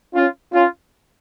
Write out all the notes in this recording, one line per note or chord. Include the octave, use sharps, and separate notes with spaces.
C#4 F4
C#4 F4